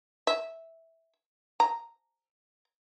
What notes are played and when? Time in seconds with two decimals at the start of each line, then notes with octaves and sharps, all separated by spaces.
0.27 E5
1.60 A#5